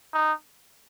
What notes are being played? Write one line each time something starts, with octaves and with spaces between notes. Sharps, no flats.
D#4